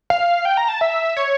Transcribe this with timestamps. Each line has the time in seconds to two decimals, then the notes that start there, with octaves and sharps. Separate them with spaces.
0.10 F5
0.45 G5
0.57 A#5
0.68 A5
0.81 E5
1.17 C#5